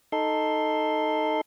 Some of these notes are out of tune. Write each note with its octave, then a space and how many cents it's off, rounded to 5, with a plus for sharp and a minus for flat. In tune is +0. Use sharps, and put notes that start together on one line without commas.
D#4 +0 A4 +0 C6 +5